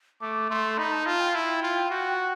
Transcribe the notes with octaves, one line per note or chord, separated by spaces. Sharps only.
A3 D6
A3 C6
D#4 B5
A5
F4 A5
G5
E4
F4
F#4